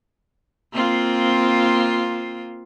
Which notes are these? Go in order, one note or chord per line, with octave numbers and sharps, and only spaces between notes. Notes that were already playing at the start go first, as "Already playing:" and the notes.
A#3 C4 F4